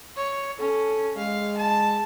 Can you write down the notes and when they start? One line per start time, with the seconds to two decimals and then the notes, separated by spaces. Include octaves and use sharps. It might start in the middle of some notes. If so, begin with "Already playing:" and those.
0.16 C#5
0.60 C#4 A4
1.17 G#3 F5
1.58 A5